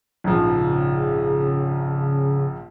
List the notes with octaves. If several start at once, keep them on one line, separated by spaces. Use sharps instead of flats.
A#1 G#2 C#3 F3